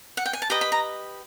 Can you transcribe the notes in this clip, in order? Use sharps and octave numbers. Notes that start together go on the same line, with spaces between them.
F#5
G5
G#5
A5
G4 B4 D#5 A#5
B5
A#5